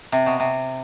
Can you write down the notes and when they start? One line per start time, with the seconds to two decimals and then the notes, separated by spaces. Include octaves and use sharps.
0.12 C3
0.26 B2
0.40 C3